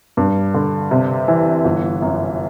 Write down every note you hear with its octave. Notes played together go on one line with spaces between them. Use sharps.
G2
D3
C3
E3
G1
F#2